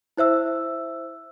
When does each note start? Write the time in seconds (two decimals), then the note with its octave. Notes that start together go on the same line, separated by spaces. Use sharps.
0.17 E4 C5 E5 E6